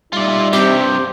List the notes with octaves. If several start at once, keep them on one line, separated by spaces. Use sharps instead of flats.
G3 D#4 F4 D5 E5
G2 C3 C4 G4